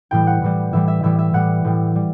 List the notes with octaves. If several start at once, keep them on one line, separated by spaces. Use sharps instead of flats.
A2 E3 G3 G5
F#5
A2 E3 G3
A2 E3 G3 E5
E5
A2 E3 G3 E5
E5
A2 G3 F#5
A2 G3
G3